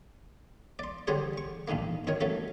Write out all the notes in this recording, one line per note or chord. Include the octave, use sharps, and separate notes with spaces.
D5 C6
D3 G3 G4 G#4 C5 C#5
C#6
A#1 G#2 D#3 G#3 A#3
F#2 D#3 A#4 C#5
F#3 A3 C#4 A4